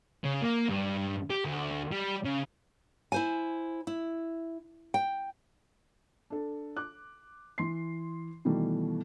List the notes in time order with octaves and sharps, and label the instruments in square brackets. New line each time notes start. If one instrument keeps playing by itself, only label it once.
[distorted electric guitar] C#3
A#3
G2
G4
D2
G3
C#3
[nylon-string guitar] E4 C5 G#5
E4
G5
[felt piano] D4 A4
D6 F#6
E3 C6 C7
B2 D#3 E3 G3 A3